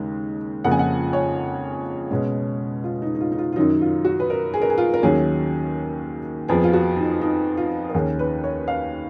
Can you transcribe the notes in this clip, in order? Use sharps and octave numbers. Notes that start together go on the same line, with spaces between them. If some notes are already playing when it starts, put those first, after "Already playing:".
Already playing: D#2 C#3 G#3
F2 C#3 F3 A#3 F#5
G#5
F#5
C#5
B2 G#3 C#4
F4
D#4
D#4
F4
D#4
F4
F4
F#2 D#3 F#3 D#4
F4
F#4
B4
A#4
G#4
A#4
G#4
F4
A#4
D#2 D#3 F#3 A#3 C#4 G#4
F2 F3 B3 G#4
F4
F#4
D#4
D#4
F4
A#4
D#2 D#3 A#3 C#4 G#4
B4
C#5
F5